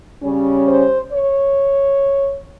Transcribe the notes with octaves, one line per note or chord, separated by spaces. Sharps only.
C#3 G3 C#4
C5
C#5